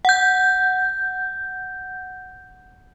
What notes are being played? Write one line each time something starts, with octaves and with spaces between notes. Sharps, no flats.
F#5 G6